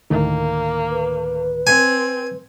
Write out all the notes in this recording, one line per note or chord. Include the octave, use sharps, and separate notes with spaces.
D2 A2 D#3 A#3
B4
C4 G#5